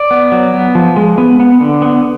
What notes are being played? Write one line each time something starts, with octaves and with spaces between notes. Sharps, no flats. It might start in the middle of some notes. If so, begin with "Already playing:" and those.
Already playing: D5
B3
F#3
B3
F3
G#3
B3
B3
D3
B3